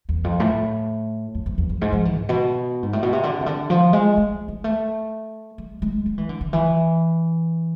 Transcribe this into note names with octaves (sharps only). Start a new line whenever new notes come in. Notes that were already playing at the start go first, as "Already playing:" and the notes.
E2
F2
A2
F2
F2
E2
F2
G#2
F3
E3
G#2
B2
G#2
A2
B2
C3
D3
C3
D3
F3
G#3
G#3
G#3
A3
G#3
G#3
G#3
E3
D3
D3
E3